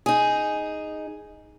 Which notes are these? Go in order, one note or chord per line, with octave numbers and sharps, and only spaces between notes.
D#4 G#4